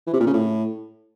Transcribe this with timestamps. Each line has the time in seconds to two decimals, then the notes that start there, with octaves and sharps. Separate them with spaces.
0.06 E3
0.13 C3
0.20 A#2
0.27 C#3
0.33 A2